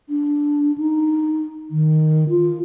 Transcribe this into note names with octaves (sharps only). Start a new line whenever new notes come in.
D4
D#4
D#3
F4